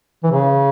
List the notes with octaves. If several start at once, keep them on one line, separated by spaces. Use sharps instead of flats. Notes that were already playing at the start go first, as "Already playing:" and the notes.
E3
C#3